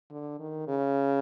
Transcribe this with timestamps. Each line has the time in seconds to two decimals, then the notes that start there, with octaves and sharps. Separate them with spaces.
0.11 D3
0.40 D#3
0.68 C#3